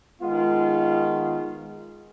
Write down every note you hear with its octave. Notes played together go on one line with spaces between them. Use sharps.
D#3 G#3 B3 F4